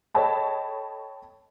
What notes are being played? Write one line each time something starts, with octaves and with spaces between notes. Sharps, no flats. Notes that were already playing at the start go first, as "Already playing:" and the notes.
A4 C#5 D#5 G5 A5 B5